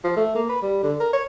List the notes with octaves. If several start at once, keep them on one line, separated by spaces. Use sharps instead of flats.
F3
A3
A#3
B4
G3
D3
A#4
C#5